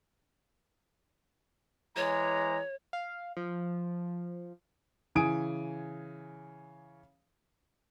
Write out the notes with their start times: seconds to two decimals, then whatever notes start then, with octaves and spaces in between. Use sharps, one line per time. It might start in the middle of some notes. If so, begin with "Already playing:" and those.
1.96 E3 G#3 C#5 A#5
2.93 F5
3.37 F3
5.15 C#3 E3 G#5 D#6 D7